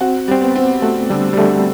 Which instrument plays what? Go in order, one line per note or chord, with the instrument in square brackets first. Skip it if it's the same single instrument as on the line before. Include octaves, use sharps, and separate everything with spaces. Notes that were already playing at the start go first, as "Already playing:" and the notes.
[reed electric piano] C4 [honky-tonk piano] F#4
[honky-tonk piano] G3 [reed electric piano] C4
[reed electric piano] B3
[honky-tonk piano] C4
[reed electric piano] A3 [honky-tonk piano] F#4
[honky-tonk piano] D3 [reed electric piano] G3
[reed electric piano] G3
[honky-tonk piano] D3 [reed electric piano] A3